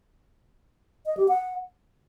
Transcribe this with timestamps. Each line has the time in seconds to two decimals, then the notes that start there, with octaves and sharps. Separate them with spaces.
1.06 D#5
1.17 G4
1.28 F#5